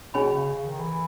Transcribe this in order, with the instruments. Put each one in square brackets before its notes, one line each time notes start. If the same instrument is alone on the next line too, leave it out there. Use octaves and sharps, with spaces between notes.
[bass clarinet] B2 [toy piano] C#4 G#4 C#5 G#5 B5
[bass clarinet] C#3
C#3
D#3
E3